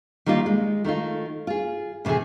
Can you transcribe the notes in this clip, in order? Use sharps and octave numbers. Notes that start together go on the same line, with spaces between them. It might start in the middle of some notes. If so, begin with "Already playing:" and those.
D#3 G3 A#3 D#4 F4
G#3
D#3 A3 D#4 F4
F4 G#4
A2 C3 D#3 E3 G#4